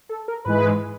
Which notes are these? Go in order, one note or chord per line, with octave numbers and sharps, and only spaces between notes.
A4
A#4
G#2 E3 G#3 B4